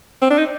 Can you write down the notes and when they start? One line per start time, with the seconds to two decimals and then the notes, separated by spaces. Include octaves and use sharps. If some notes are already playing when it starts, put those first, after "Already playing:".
0.22 C4
0.30 D4
0.38 D#4